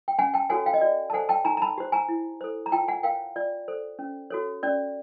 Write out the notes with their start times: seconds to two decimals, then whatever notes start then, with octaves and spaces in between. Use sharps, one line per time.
0.08 G5
0.19 C#4 F#5 G#5
0.34 G5 A5
0.50 F#4 A4 C#5 F#5 G#5
0.66 F5 G5
0.74 D#5
0.81 F#4 D5
1.10 A5
1.13 A4 C5 F#5 G#5
1.29 G5 A5
1.45 D#4 G#5 A#5
1.57 A#5
1.62 A5 B5
1.78 G4 C5
1.92 G#5 A#5
2.09 E4
2.41 A4 C5
2.66 A#5
2.72 F4 G5 A5
2.88 F#5 G#5
3.03 A#4 C#5 F5 G5
3.36 F4 D5
3.68 A4 C5
3.99 C#4
4.30 F#4 A4 C#5
4.63 C#4 D5